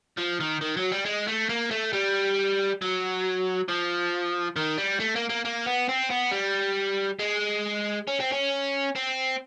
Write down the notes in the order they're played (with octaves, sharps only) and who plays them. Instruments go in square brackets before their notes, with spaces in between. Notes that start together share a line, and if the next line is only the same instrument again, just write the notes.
[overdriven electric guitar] F3
D#3
D#3
F#3
G3
G#3
A3
A#3
A3
G3
F#3
F3
D#3
G3
A3
A#3
A#3
A#3
B3
C4
B3
G3
G#3
C#4
C4
C#4
C4